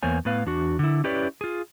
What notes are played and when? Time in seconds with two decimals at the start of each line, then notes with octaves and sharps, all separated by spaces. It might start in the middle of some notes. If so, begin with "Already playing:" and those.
0.03 E2 A#3 B3 C5 C#5 G#5
0.25 A2 B3 B4 F5
0.46 E2 D4 F#4
0.79 D3 E4
1.04 C#4 E4 G4 B4 C#5 D5
1.41 F4 G#4